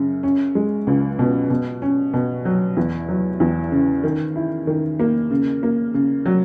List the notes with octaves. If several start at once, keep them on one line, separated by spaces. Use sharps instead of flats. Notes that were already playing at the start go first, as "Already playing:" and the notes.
Already playing: F#2 C#3
C#4
G#3
C#2
B2
B2
C#4
B2
F#3
E2
F#3
E2
C#3
D#3
E4
D#3
A#3
C#3
A#3
C#3
F#3